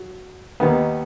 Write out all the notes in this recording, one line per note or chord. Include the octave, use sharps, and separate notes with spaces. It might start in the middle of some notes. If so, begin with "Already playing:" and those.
Already playing: F#3
D#2 D#3 B3